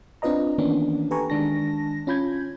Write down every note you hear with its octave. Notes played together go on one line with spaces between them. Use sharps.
C4 D4 F4 B4 D#5 A#5
D#3 E3 A#3 B3 C#4 D4
G4 A4 B4 G#5 A#5 C#6
D#3 G#3 D4 A5 A#6
C#4 F4 B5 G6 G#6